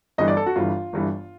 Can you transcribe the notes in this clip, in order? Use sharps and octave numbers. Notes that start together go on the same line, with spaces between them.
G1 G2 E3 D#5
D5
A4
F#4
G1 G2 E3 F4
G1 G2 E3